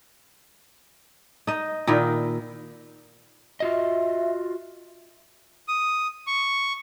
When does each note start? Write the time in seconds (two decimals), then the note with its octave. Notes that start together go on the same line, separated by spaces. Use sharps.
1.47 D#4 D#5
1.87 A#2 D#3 D#4 E4
3.60 F4 F#4 D#5 E5
5.68 D#6
6.27 C#6